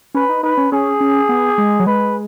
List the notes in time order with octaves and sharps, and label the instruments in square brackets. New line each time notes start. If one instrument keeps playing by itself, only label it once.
[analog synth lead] C#4 [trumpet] B4
[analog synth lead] D#4
[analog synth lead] D#4 [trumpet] B4
[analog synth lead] C#4
[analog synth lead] C#4 [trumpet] G#4
[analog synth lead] C#4
B3
G#3
F#3
[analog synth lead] G#3 [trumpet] B4